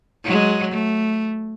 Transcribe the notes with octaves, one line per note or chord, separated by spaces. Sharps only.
F#3 G#3
A3